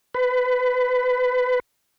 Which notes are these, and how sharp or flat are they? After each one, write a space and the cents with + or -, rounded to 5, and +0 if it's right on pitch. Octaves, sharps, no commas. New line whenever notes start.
B4 +25